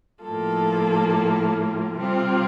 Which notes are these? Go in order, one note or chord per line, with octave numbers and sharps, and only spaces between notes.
A2 F3 A#3 F4 A4
C3 G3 C4 F4